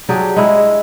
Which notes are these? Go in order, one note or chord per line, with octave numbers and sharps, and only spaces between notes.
F#3 D4 G4 G#4
G#3 E4